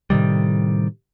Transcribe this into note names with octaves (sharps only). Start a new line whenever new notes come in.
A2 C3 D#3 G3